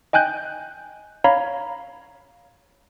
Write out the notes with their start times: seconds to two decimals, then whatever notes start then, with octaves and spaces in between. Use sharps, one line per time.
0.13 D#5 G5 G#5 F#6 G6
1.24 C#5 F5 A#5 B5